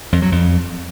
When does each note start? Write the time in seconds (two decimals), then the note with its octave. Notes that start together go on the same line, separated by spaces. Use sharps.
0.12 F2
0.22 F#3
0.32 F2